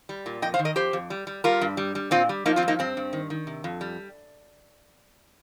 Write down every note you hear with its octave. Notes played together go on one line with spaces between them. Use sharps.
G3
A#2
F2 D#5 G5
C5 F5
D#3
A#4 D#5
F2 G4 C5
F2
G3
G3
G3 F4 A#4
G2
G3
G3
A#2 C4 F4
G3
F3 A#3 D#4
C4 F4
G2
A#3 D#4
G2 C4
G2
D#3
D#3
C3
F2
G3